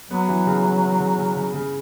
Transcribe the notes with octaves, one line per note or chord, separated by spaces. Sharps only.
F#3 B3
E3
C#3
E3
E3
C#3
C#3
C#3
C#3